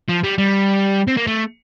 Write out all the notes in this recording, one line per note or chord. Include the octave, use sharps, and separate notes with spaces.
F3
G3
G3
C4
A#3
A3